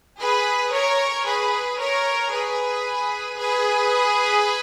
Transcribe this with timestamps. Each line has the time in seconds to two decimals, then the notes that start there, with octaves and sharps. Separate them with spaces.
0.21 G#4 B4
0.73 A#4 C#5
1.27 G#4 B4
1.80 A#4 C#5
2.33 G#4 B4
3.39 G#4 B4